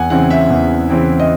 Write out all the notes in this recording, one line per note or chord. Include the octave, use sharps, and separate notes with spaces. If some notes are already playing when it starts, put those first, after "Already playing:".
Already playing: E2 F#5 G#5
C#3 E3 C4 E4 F#5
E5
E2
C#3 E3 C4 E4
D#5